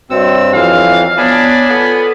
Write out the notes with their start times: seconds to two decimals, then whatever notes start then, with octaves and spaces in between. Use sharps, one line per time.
0.10 G2 C4 F#4 C#5 D#5 E6
0.54 F2 E3 F5
1.18 B3 D4 C#5 G#5 B5 D#6
1.69 B3 F4 A4